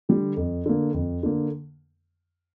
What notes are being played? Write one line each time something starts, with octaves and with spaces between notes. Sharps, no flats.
D3 G3
F2
D3 A#3
F2
D3 A#3